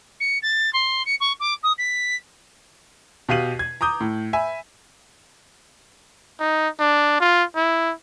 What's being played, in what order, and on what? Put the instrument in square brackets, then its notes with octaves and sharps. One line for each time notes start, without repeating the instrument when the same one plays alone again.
[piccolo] C#7
A6
C6
C#7
C#6
D6
D#6
B6
[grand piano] B2 G4 F5 C7 D#7 F#7
G#6
A#5 D6 D#6 G6
A2
E5 G#5 B5
[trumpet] D#4
D4
F4
E4